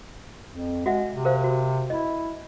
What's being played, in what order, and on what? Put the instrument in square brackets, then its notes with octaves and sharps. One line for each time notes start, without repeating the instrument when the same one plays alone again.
[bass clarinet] F2
[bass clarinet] G#3 [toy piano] F#4 E5 F#5
[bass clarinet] C3
[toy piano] A#4 C5 F5
F#4
[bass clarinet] E4 [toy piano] D#5